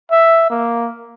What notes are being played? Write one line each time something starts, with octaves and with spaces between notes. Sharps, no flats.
E5
A#3